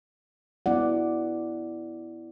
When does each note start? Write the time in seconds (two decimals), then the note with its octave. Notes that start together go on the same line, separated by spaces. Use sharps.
0.66 B3 E4 D5 F#5